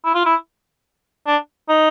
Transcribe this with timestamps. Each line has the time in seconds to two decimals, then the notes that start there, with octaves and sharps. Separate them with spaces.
0.05 E4
0.15 F4
0.26 E4
1.27 D4
1.69 D#4